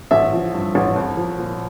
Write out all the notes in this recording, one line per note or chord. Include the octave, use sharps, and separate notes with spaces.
A1 E5
F3
G2
A1
C2
F3
A#2